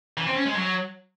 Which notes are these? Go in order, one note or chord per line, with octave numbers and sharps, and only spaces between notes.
E3
C4
C#4
G#3
F#3